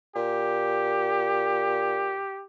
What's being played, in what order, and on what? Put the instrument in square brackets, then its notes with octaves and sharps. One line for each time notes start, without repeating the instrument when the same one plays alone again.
[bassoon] A#2 [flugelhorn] G4